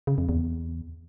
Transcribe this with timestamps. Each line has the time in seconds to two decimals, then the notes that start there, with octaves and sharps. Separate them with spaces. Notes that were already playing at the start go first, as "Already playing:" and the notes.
0.07 C#3
0.18 F2
0.29 E2